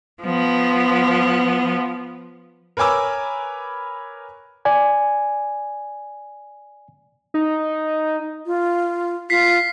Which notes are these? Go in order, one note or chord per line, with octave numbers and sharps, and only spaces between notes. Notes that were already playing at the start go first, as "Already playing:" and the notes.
F3 B3
A#4 B4 C#5 G#5 D6 E6
D5 G#5
D#4
F4
F4 B6 C7